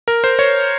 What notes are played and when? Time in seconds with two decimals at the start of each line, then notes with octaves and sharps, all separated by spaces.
0.08 A#4
0.24 C5
0.39 C#5